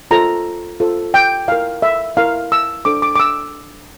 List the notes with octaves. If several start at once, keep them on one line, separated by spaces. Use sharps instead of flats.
F4 A4 C5 A#5
F4 A4 C5
G5
E4 A#4 F5
E5
E4 A#4 F5
E6
D4 A4 C5 D6
D6
D6
E6